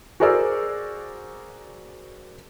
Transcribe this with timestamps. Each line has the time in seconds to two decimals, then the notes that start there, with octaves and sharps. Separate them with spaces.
0.20 F#4 G#4 A#4 C5 D5 E6